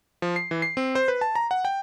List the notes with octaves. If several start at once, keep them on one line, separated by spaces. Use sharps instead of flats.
F3
C7
E3
C7
C4
C5
B4
A5
A#5
F#5
G5